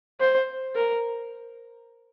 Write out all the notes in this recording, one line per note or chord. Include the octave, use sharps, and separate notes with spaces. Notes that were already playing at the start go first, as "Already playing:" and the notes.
C5
A#4